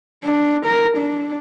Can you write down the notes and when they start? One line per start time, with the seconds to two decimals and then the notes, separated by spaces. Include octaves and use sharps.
0.23 D4
0.66 A#4
0.97 D4